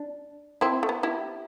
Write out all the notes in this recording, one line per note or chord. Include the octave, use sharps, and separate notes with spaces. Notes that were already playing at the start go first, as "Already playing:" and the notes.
Already playing: D4
C4 E4
A3
B3
E4 G4